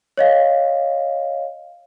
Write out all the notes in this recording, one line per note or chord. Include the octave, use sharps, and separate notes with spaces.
C#5 D#5 F5